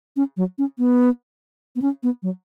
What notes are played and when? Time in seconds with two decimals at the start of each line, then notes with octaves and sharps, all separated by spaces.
0.16 C#4
0.37 F#3
0.58 C#4
0.78 B3
1.76 B3
1.82 C#4
2.03 B3
2.23 F#3